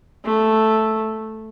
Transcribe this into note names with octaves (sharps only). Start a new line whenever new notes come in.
A3